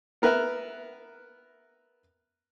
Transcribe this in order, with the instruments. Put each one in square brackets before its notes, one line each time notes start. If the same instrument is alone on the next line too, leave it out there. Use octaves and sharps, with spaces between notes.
[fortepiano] B3 A#4 B4 E5